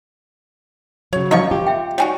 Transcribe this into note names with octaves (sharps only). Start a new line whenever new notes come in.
C#3 F#3 C#5
F3 A#3 D#4 C#6
F4 G4
E5 G5
G3 D#4 F#4 C#5 G5 G#5